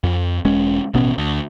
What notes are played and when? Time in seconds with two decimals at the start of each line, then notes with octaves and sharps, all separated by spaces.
0.04 F2
0.45 E1 G#3 C#4
0.94 A1 B2 B3 C#4
1.18 D2